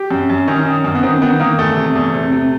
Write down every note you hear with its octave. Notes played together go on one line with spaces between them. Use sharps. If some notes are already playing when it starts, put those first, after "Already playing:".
Already playing: G4
F#2
F#2
D#3 C#4
D#3
F#2
B3
D#3 C4
D#3 B3
D#3 A#3
E2 A3
C3
E2
C3
C3